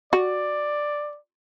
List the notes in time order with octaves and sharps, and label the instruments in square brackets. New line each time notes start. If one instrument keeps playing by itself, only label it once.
[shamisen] F#4 [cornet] D5